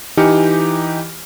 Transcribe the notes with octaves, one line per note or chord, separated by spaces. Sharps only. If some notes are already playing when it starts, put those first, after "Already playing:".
E3 D#4 G4 G#5 F6 C#7